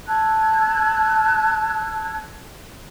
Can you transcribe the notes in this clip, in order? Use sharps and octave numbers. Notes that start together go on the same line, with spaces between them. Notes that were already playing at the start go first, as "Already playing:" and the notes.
A5 E6 F#6 G#6